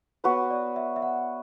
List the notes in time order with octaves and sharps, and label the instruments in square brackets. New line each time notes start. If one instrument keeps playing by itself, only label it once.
[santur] B3 F#4 B4 [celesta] C#5
[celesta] D5
E5
E5
F#5